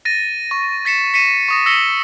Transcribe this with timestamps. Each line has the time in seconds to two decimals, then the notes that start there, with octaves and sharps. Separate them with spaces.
0.05 A6 A#6 D#7
0.51 C#6
0.85 A6 B6 C#7 E7
1.14 B6 C#7 D#7 E7
1.48 C#6 D#6 A#6
1.66 E6 A#6 B6 C#7 G7